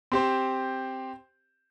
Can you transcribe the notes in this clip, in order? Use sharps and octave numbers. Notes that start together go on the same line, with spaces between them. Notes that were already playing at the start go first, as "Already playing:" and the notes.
C4 G4 C5